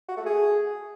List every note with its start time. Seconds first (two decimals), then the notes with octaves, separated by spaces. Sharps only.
0.08 F#4
0.17 A3
0.26 G#4